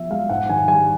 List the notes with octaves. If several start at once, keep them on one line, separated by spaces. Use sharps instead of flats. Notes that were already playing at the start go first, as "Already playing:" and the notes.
Already playing: F3 B3 E5
G#3 F5
G#2 F#5
D#3 G#5
G3 G#5